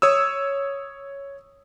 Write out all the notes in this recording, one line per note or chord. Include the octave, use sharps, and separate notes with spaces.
C#5 D#6 E6